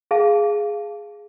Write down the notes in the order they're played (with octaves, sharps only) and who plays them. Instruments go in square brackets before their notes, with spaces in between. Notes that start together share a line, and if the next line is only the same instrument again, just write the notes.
[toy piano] G#4 F5 A5